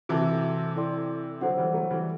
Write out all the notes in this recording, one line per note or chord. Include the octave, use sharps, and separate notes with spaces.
C3 E3 F#4 A4 E5 A5 D6
E4 A4 D5 G5 C6
D3 F#3 A4 C5 F#5
E3 G3
F#3 A3
E3 G3